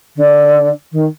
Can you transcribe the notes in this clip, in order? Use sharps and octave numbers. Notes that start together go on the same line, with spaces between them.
D3
D#3